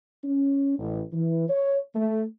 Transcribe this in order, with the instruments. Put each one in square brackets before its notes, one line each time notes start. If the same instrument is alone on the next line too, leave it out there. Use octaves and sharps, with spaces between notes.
[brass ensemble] C#4
A1
E3
C#5
A3